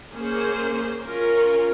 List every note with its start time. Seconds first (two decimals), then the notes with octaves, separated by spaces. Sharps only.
0.12 A#3 C#4 G#4 C5
1.01 C#4 F4 A#4